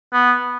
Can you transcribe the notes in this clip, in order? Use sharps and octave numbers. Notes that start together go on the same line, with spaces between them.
B3